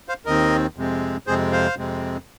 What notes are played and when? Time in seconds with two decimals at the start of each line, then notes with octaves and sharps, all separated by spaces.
0.09 C5 F5
0.25 D#2 D#3 C4 A#4 D#5
0.76 F2 C3 G#3 C4
1.27 F2 C3 G#3 C4 G#4 C5
1.52 C5 F5
1.77 F2 C3 G#3 C4